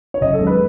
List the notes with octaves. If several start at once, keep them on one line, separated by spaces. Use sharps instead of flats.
C#5
F#1 D#5
A4
F#2 D#3 G#3
B4